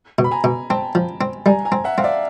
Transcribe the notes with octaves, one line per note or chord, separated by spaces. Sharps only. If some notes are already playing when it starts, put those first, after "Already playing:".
B2
B5
G#5 A#5
B2
C4 G5 A5
F3
C4
G3 G#5 A#5
G#5 A#5
C4
E5 F#5
C4 F5
D5 E5